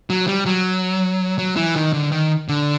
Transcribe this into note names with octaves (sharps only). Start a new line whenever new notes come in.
F#3
G3
F#3
F#3
E3
D#3
D3
D#3
D3